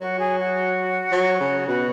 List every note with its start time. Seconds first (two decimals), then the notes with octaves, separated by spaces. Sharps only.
0.01 F#3 F#4
0.19 G#4
0.39 F#4
1.12 F#3
1.40 C#3
1.68 B2 F#4